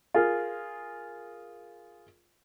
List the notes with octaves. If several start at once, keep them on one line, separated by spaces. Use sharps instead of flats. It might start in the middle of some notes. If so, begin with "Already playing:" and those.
F4 G#4 A#4